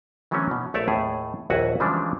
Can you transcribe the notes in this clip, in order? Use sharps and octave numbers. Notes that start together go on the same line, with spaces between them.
D3 E3 F#3 A3 C4 C#4
B2
A#1 A3 C#5 D5 E5 A5
D#2 A2 G#4
A#1 D#2 E4 F#4 F#5 G#5
C#3 E3 F3 G3 G#3 D4